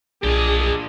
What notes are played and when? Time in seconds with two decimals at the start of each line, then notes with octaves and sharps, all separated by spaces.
0.24 B1 A#2 D4 G4 G#4 D#5